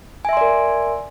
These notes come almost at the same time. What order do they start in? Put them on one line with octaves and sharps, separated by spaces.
G#5 E5 C6 D5 A#4